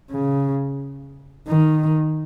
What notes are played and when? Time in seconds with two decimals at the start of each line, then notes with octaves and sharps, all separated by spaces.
0.11 C#3
1.48 D#3